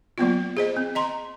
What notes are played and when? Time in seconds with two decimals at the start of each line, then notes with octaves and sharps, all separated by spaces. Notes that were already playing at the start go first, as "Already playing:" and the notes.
0.18 F#3 A#3 B3 F4
0.57 G#4 C5 D#5
0.77 C4
0.95 D#5 A#5 C6